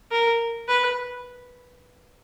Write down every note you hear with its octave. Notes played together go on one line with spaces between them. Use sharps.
A#4
B4